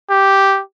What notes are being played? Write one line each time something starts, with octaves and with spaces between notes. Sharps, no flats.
G4